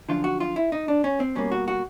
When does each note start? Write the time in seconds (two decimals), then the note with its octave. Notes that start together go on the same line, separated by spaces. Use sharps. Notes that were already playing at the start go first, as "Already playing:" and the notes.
0.09 F#2 D3 F3 F4
0.24 F#4
0.40 F4
0.56 E4
0.72 D#4
0.88 D4
1.04 C#4
1.20 C4
1.35 B2 G3 A#3 C#4
1.52 F#4
1.68 F#4